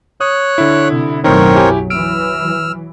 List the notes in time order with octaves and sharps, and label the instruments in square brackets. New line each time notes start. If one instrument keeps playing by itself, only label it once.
[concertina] C#5 F#6 [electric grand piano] D#6
[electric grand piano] D3 E4
[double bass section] C3
[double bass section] B1 F#2 F#3 [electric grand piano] A2 D#3 [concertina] C4 A#4 C#5
[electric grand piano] E4 G4 G#5
[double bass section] E3 F#3 [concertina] E6 F6 [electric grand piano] D7